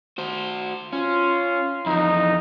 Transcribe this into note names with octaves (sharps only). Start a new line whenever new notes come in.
F#4 C5
C#4 F4
F2 E3 D#4